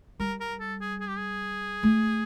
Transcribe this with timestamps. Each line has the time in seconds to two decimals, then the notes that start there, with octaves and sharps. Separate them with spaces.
0.20 G3 A#4
0.41 A#4
0.60 A4
0.81 G#4
1.01 G#4
1.08 G4
1.17 G#4
1.83 A3